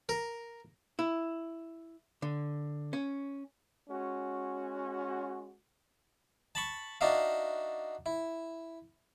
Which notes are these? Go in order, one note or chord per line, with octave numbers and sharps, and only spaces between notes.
A#4
E4
D3
C#4
G#3 C#4 F#4
A5 B5 C#6
D4 D#4 F#4 E5 F5
E4